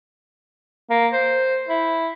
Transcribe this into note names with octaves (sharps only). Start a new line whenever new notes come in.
A#3
C5
E4